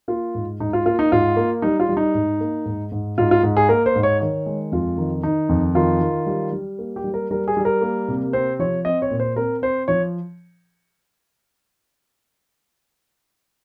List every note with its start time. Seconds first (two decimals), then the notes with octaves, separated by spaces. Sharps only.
0.08 A#3 F4
0.35 G#2
0.60 G#2 D#4
0.73 F4
0.85 A#3 F4
0.99 D#4
1.12 G#2 F4
1.37 A#3
1.62 G3 D#4
1.80 F4
1.89 G3
1.97 D#4
2.14 G#2
2.40 A#3
2.66 G#2
2.92 G#2
3.18 G#2 F4
3.31 F4
3.43 G#2
3.57 G#4
3.69 A#3 A#4
3.86 C5
3.96 G#2
4.03 C#5
4.20 D#3 C#5
4.46 G#3
4.72 F2 F4
4.98 D#3
5.23 D#3 D#4
5.49 F2
5.75 D#3 F4
6.01 D#3
6.27 G3
6.52 G3
6.79 A#3
6.96 G4
7.04 G3
7.14 A#4
7.31 G3 A#4
7.48 G#4
7.57 G3
7.65 A#4
7.82 A#3
8.08 C3
8.33 C4 C5
8.59 F3 C#5
8.85 C4 D#5
9.02 C#5
9.11 A#2
9.20 C5
9.36 C4 A#4
9.62 C4 C5
9.88 F3 C#5